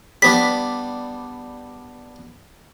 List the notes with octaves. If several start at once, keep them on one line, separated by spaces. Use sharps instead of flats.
G3 B3 D4 B6